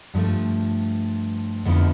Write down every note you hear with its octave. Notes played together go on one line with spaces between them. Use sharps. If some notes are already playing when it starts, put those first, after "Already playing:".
G2 F3 A3
F2 D3 F3 B3 E4